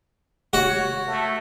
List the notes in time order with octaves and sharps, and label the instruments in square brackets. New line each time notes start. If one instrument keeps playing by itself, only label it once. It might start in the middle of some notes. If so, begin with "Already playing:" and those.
[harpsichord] F#4 [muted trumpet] C#5
[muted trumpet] A3